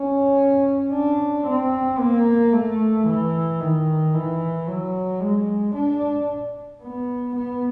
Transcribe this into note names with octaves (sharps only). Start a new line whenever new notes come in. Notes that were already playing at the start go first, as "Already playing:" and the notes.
Already playing: C#4
D4
C4
A#3
A3
E3
D#3
E3
F#3
G#3
D4
B3
B3